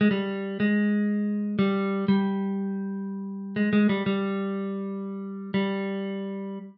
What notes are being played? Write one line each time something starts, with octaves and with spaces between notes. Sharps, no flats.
G#3
G3
G#3
G3
G3
G#3
G#3
G3
G3
G3